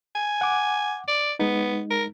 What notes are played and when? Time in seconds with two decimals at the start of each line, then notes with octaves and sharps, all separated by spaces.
0.15 G#5
0.41 F#5 D6
1.08 D5
1.39 G#3 B3 D#4
1.90 A#4